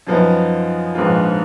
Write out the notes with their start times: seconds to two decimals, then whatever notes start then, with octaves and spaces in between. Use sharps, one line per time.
0.07 F#2 F3 B3 D#4
0.95 A#1 G#2 F3 B3 F4